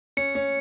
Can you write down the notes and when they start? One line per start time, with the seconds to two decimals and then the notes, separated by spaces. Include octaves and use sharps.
0.17 C#4 C#7
0.35 C#4